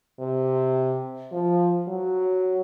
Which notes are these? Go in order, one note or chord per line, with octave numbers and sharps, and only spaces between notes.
C3
F3
F#3